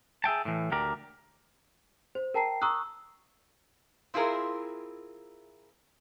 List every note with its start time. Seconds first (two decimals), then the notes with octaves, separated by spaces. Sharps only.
0.24 G#4 E5 G5 A5
0.45 A2 E3
0.72 D2 G4 A#4 D5
2.15 C5
2.34 A#4 G5 A5 A#5 C7
2.61 A#5 C#6 D#6 E6 F#6
4.14 C4 E4 F4 G#4 A#4